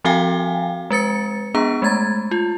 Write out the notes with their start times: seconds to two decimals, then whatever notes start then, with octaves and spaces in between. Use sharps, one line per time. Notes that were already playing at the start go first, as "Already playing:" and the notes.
0.05 F3 C4 F#4 F5 G5 G#5
0.90 G#3 B4 A6 C#7
1.54 B3 D4 G#4 A#5
1.82 G#3 A3 G#6 A6
2.31 F4